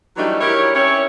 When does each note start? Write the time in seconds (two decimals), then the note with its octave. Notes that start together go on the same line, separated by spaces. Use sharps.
0.17 E3 F#3 G3 A3 D4 D#4
0.41 E4 G4 A#4 C#5
0.74 C4 C#4 E4 G4 C#5